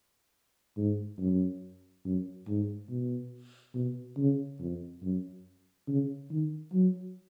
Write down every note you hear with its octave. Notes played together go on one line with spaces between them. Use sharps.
G#2
F#2
F#2
G#2
B2
B2
C#3
F2
F#2
C#3
D#3
F#3